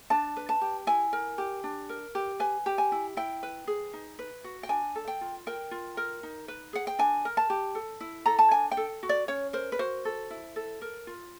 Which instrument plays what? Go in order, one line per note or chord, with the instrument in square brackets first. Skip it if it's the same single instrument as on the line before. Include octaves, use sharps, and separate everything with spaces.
[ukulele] D4 A5
B4
A5
G4
E4 G#5
A#4
G4
D4
A#4
G4
B4 G#5
G4
G#5
E4
E4 G5
B4
G#4
D#4
B4
F#4
G5
D4 G#5
A4
G5
F4
A#4 G5
F4
A#4
D#4
B4
G#4 F#5
G5
D4 G#5
A#4
A5
G4
A4
E4
A4 A#5
A5
D4 G#5
G5
A4
F#4
D5
C#4 C#5
A#4 C5
B4
F#4 C5
A4
E4
A4
A#4
F4